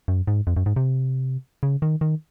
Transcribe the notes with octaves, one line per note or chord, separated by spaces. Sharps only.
F#2
G#2
F2
F#2
G#2
C3
C#3
D#3
D#3